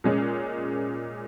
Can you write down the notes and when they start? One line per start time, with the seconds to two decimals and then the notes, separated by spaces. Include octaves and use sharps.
0.04 A#2 G#3 C#4